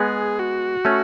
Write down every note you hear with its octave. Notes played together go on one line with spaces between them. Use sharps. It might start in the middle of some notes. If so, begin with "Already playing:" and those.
Already playing: G#3 B3 G#4
F#4
A3 C#4